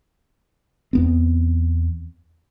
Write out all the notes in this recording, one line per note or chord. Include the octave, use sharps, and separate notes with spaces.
E2 B3 C4